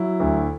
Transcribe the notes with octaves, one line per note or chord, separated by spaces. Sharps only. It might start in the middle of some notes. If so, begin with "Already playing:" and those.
Already playing: F#3 E4
D2